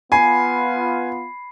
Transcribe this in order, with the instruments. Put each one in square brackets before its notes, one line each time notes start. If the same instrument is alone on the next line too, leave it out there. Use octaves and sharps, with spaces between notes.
[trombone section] B3 F4 [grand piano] G#5 [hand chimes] B5 C7